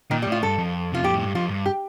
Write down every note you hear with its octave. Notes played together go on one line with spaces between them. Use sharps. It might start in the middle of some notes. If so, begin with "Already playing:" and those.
A#2 D#3
G3
A2 F4
G2 A4
F2
C3 F4
A#2 G4
A2
G2
F2 F4
G2
G4